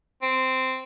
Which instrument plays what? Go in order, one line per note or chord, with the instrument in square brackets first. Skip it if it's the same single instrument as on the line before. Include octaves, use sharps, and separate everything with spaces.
[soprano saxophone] C4